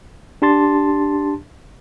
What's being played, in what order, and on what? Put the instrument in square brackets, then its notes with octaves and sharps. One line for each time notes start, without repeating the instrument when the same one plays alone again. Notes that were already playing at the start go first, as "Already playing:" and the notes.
[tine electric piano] D4 G4 A5 C6 A6